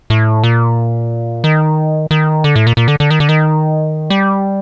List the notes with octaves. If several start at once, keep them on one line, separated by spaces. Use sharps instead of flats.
A2
A#2
D#3
D#3
D3
A2
A#2
A#2
D3
D3
D#3
D3
D#3
G3